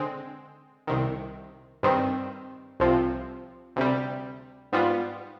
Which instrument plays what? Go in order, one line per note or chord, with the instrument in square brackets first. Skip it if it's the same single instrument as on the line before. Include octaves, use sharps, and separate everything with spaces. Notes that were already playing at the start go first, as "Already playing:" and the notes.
Already playing: [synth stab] D3 G#3 C4
C2 C3 D#3
G2 D#3 G3 C4
C2 C3 F3
D2 C3 G3
G#2 G3 B3 F4